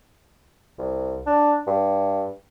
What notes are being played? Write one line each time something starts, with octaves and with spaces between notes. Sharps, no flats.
C2
D4
G2